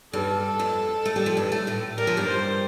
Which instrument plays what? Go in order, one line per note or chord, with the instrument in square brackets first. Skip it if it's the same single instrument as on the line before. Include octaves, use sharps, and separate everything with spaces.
[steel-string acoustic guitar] G2 G3 [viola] A4
[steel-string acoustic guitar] F2 F3
A3
G3
F3
G2 G3
A3
A2 A3
[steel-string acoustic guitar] G3 [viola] A#4
[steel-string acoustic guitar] F3
G2 G3
[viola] C5